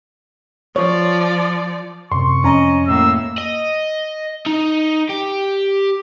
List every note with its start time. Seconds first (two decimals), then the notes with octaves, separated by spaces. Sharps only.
0.76 F3 C#5 D5
2.12 F#2 C3 C6 C#6
2.44 F2 C#4 D#5 A#5
2.88 A2 A#3 E6
3.38 D#5
4.46 D#4
5.10 G4